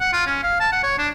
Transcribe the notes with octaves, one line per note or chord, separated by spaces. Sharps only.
F#5
F4
C#4
F5
A5
F#5
C#5
D4